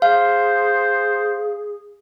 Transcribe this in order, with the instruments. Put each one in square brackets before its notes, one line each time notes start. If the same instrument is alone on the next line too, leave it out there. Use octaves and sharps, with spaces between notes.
[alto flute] G#4 [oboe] C5 [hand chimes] F5